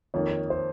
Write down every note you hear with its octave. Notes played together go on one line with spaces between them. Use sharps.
F2 D#3 A#3 C#5
C5